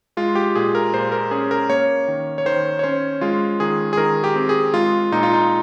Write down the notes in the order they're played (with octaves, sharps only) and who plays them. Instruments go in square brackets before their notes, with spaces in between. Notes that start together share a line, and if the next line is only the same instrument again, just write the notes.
[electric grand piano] G#3 F4
G4
A#2 G#4
A#4
A#2 C5
A#4
C#4 G#4
A#4
A#3 C#5
D#3
C#5
D#3 C5
C#5
C#4 C5
G#3 F4
D#3 G#4
G#4
D#3 A#4
G4
C4
G#4
G#3 F4
A#2 D#4
F4
D#4